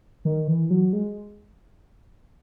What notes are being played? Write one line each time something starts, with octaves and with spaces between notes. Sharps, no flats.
D#3
E3
F#3
G#3